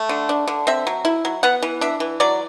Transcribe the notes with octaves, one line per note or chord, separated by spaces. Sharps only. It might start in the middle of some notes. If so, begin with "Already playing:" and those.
Already playing: A3
D3
D4
D3
C4 E5
F#3
E4
F#3
B3 F#5
E3
D4 E5
E3
F#3 D5